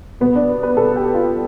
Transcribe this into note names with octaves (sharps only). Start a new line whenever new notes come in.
B2 B3
D4
B4
B2 A4
G4
F4